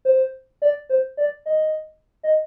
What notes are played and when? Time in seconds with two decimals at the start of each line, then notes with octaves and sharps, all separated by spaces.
0.05 C5
0.62 D5
0.89 C5
1.17 D5
1.46 D#5
2.23 D#5